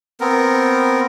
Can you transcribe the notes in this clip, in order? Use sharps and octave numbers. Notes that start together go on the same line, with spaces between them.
B3 C4 A#4